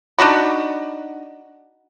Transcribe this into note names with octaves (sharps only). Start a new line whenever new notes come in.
D4 D#4 F#4 B5